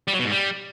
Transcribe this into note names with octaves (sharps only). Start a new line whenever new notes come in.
G3
F#3
B2
G#2
G3